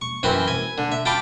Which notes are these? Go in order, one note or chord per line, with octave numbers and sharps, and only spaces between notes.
C#6
F#2 E3 C4 B4 C6
G#5
D3
E5
F4 G5 A5 B5 D6